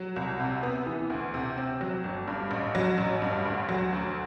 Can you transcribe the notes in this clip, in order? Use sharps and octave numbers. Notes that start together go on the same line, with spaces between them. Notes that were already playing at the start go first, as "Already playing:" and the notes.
Already playing: F#3
C2
C3
B3
E3
D2
C3
C4
F#3
G1
G2
A1
F#3
A1
G2
D2
F#3
D2